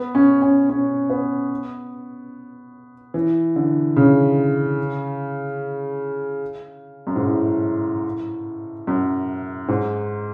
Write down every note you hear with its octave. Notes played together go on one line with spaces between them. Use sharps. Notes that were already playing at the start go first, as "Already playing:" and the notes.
Already playing: B3
C#4
C#4
C#4
B3
E3
D3
C#3
F#2
G#2
A2
F#2
G#2